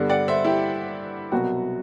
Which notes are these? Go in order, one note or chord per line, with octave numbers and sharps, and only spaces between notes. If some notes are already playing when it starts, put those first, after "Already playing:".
Already playing: G2 D3 G3 B3
D5 F#5
C5 E5
E4 G4
C2 B2 F#3 B3 F#4